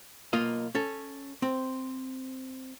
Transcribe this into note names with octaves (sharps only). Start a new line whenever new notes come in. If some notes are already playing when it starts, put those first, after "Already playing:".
B1 A#3 F4 D#5
C#4 A4
C4